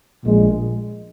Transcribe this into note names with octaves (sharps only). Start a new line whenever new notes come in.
A#1 A#2 G#3